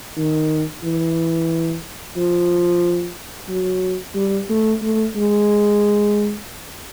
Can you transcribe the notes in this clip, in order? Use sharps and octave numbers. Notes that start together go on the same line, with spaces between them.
D#3
E3
F3
F#3
G3
A3
A3
G#3